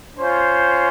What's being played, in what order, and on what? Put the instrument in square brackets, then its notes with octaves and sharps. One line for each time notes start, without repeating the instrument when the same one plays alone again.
[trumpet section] C#4 F4 C5